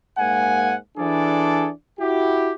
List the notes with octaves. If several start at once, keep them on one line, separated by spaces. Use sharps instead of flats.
G#2 A#3 F#5 G#5
E3 D4 G#4 A4 D5
E4 F#4 G4